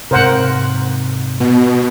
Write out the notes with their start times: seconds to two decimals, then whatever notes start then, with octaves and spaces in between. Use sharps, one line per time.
0.11 G#2 C3 A#4 C5 F#5
1.40 B2